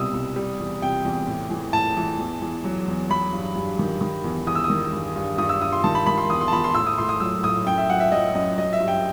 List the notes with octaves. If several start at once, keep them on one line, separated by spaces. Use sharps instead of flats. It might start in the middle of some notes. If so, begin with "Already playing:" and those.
Already playing: C2 B2 G3 D#6 E6
C2
G3
E2
C3 G5
E2
A2
E3
A2 A5
E3
E2
E2
F#3
E2
F#3 B5
G2
G2
D#3
D#3
E2
E2 D#6
E6
D#6
D#3
G2
G2
G2 D#6
E6
G2 D#6
C6
D#3 A5
B5
D#3 B5
C6
E2 D#6
C6
A5
E2 B5
C6
A2 E6
D#6
A2 C6
D#6
F#3 E6
A2 D#6
F#2 G5
E5
F#3 F#5
E5
F#3 D#5
F#2 D#5
F#3 D#5
E5
G2
G5